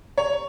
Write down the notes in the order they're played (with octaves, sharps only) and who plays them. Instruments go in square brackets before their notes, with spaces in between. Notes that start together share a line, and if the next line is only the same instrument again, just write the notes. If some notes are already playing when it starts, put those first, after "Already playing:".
[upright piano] C#5